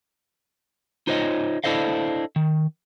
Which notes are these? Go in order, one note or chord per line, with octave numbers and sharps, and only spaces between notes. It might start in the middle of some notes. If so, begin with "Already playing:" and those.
D#4 F4 C5 C#5 D#5
D4 E4 A4 C5 D#5 F5
D#3